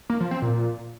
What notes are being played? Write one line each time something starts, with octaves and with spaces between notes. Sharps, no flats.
A#3
F3
C4
A#2